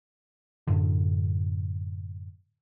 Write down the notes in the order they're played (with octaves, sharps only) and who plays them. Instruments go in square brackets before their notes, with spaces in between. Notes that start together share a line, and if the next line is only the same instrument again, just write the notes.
[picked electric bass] F#2 A2 D3